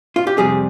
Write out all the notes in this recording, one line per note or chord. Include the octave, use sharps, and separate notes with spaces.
F4
G4
F2 C3 G3 G#4